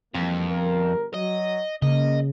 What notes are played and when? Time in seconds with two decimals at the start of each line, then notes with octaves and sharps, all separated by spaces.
0.14 F2 E3 G3 A#3
0.49 G1 A#4
1.14 F#3 D#5
1.82 C#3 A#3 D#5